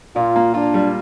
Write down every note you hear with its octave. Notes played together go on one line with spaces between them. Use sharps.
A#2 F4
A#3
D4 F4
G3